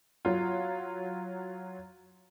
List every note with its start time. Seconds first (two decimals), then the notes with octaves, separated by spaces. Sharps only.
0.25 F#3 F4